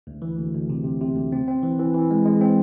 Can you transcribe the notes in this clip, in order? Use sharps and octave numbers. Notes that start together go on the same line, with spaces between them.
D2
E3
D2
D2
C3
C3
C3
D2
C4
C4
E3
E3
E3
G#3
G#3
C4